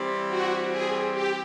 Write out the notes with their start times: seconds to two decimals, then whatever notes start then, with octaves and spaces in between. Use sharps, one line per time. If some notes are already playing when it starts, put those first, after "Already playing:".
Already playing: E3 G3 C4
0.29 F#4
0.70 G#4
1.13 G4